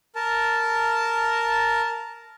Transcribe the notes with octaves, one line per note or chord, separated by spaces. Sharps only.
A#4 A5